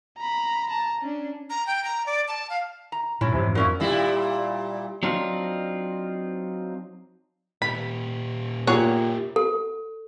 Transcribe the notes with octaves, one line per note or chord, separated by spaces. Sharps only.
A#5 B5
A5 A#5
C#4 D4
A#5
G5
A#5
D5
A5
F5
A#5
G2 A#2 C#4 E4
F2 G#2 C3 E3
A#2 F#3 C#4 E4
A#2 G3 E4
F#3 C4 D4 D#4 F4
A#2 G4 B5
A#2 A#3 E4 G4 G#4 C#5 F#5
A4